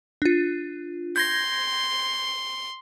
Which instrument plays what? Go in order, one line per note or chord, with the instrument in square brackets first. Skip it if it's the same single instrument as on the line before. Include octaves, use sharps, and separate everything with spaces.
[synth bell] D4 F4
[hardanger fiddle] C6 [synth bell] G6 G#6 A#6